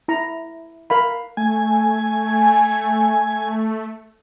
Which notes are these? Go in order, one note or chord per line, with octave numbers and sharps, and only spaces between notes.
E4 A#5
A#4 F5 B5
A3 G#5